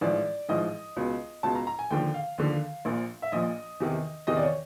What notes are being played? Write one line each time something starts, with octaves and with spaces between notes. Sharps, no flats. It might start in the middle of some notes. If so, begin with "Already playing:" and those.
A1 G#2 F3 D5
A1 G#2 F3 D#5
C#2 B2
C#2 B2 A5
A#5
A#5
G#5
D#2 D3 F3 G5
F5
D#2 D3 F3
A#1 A#2 F3
E5
A#1 A#2 F3 D#5
E2 C3 D#3
E2 C3 D#3 D#5
D5
C#5